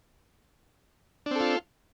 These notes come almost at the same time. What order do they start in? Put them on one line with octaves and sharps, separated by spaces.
D4 C4 A4 F4